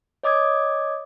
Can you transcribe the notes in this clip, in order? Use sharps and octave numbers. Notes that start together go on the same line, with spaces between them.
C#5 D#5 D6 D#6 G#6